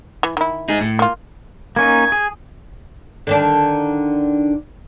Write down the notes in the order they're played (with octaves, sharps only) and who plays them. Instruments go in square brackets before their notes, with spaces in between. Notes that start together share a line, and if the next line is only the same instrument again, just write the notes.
[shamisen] E3
D#3 E4
[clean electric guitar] D#4 G#4
A2
[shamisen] A#3 F4
[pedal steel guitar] A#3 C#4 D#4 [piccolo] G#6
[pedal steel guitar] G#4
[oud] D3 D#3 D4